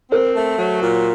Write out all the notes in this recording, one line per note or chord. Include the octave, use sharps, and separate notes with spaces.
C4 A#4 C5
A3
F#3
A#2